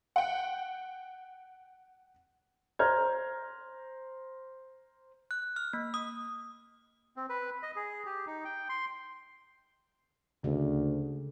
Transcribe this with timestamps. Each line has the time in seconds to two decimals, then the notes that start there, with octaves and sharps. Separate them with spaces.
0.16 F#5 G5
2.79 C5 A#5 F6 G6 G#6
5.31 F#6
5.56 F6
5.73 A#3
5.94 D#6
7.16 C4
7.29 B4
7.63 D#5
7.76 G#4
8.06 G4
8.27 D#4
8.44 G5
8.69 C6
10.44 D2 C#3